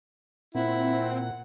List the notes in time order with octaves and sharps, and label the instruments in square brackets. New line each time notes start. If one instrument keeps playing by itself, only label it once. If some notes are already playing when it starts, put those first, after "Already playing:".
[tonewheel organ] A#2 [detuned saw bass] C4 [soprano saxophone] E4 [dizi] F#5